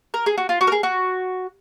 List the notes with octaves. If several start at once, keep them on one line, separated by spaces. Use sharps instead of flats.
A#4
G#4
F#4
F4
F#4
A#4
G#4
F#4